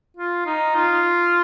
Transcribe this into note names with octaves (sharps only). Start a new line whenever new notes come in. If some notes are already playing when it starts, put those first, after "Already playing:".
F4
D#4
F4